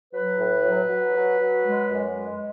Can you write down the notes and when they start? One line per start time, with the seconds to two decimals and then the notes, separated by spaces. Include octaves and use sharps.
0.14 F#3 B4
0.38 A2
0.64 F#3
0.88 F#3
1.14 F#3
1.39 F#3
1.64 G#3
1.89 F#2
2.14 G#3